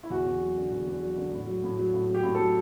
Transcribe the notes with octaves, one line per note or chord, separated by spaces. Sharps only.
E4
E2 F#4
E2
F#3
D3
E2
E2
F#3
D3
A2
F#3
A2
F#3
A2
F#3
G4
A2
F#3 A4